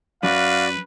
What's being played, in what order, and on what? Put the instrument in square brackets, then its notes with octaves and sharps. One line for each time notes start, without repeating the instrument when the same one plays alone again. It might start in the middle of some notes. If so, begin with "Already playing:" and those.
[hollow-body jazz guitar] F#2 [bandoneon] F#4 D5 [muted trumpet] B4 [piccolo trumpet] F5